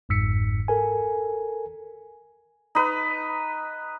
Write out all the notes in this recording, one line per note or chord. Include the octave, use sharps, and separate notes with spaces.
G1 F2 G#2 E6 B6 C#7
A4 A#4 G#5
D#4 B4